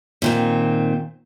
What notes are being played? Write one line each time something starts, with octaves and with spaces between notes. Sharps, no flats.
A#2 D#3 C4